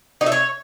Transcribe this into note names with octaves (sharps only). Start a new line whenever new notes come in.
D#4
E5
C#5